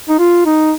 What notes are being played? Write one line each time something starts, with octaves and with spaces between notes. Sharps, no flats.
D#4
F4
D#4